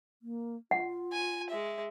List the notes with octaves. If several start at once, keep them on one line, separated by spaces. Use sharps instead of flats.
A#3
F4 F#5
G#5
G#3 E5